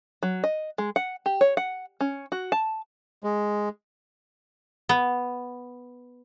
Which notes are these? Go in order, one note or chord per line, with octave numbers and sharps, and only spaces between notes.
F#3
D#5
G#3
F#5
G4
C#5
F#5
C#4
F#4
A5
G#3
B3